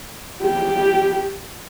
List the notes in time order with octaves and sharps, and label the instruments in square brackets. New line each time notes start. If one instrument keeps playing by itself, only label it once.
[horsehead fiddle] G4